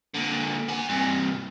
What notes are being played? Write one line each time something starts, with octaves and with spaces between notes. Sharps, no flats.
A#2 D3
B3 G#5
G2 C3